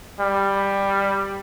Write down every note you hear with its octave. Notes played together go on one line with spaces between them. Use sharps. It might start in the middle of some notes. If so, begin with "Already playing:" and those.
G3